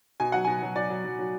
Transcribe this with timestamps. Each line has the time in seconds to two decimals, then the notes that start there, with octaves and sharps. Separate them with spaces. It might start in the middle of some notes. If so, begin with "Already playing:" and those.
0.20 B2 G#5
0.32 F#3 F#5
0.45 B2 G#5
0.63 F#3
0.76 F#3 D5
0.90 F#3
1.04 F#3
1.19 F#3